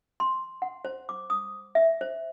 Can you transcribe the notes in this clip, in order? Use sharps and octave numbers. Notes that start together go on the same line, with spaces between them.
C6
F#5
C5
D6
D#6
E5
C5